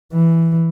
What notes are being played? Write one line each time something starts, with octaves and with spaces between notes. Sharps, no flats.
E3